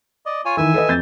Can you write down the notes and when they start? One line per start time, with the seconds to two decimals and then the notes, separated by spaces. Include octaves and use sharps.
0.26 D5 D#5
0.45 F4 C#5 G#5
0.57 D#3 E3 E5 G#5
0.74 A4 B4 D#5
0.88 F2 G6 A6